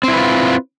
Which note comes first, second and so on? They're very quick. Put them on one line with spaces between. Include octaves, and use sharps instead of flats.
C4 E4 B4 F4